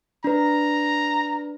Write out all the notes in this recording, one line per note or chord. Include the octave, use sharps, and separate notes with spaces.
D4 B4 A#5